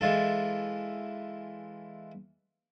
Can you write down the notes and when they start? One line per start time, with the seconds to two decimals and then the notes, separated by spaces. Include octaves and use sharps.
0.01 E3 G#3 F4 A4